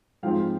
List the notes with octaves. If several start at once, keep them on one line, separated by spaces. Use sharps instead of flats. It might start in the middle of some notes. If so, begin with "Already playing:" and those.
G#2 F3 G#3 C4 F5 G5